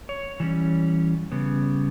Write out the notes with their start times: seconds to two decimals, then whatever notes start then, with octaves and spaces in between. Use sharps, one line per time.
0.09 C#5
0.40 E3 G3 C#4
1.32 C#3 G3 B3